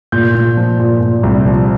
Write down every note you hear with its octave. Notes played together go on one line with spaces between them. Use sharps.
A#2 G6
A#2
F3
A#2
A#2
C2
F3